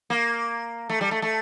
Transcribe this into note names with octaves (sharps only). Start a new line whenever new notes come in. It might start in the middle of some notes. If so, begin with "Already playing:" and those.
A#3
A3
G3
A3
A3